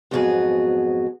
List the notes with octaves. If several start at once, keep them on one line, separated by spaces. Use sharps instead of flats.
F2 G#2 F#3 B3 F#4 G#4